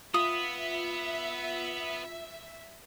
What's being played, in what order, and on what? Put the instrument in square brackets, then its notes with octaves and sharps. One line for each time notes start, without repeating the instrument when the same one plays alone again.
[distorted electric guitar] B3 [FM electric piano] F4 [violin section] E5 [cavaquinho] D#6